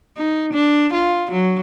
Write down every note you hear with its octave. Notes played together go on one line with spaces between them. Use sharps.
D#4
D4
F4
F#3